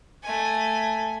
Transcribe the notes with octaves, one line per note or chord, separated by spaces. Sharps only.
A3 G#5